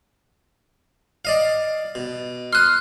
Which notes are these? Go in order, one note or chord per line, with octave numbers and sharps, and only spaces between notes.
D5 D#5 F5
B2
C6 D#6 F6 F#6